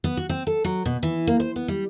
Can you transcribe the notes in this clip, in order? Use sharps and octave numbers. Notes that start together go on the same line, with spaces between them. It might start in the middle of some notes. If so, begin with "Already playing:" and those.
B3
F#4
C4
A4
F#3
B2
E3
A#3
C5
B3
G3